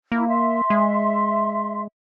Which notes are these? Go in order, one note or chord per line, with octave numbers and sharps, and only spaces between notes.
A#3 E4
E5 C6
G#3